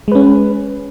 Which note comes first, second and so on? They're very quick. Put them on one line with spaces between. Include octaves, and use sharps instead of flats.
G#3 B4 C#4